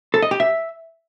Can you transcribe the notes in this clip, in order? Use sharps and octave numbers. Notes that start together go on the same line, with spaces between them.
A4
D#5
G4
E5